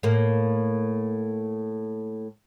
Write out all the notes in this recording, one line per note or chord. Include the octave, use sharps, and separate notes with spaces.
A2 A#3